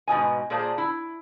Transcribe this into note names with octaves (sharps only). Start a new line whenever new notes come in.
G#2 B2 D#5 G#5
A#2 G#4 C5 D5 A5
E4